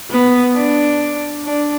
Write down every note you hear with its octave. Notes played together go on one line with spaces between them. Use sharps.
B3
D4
D4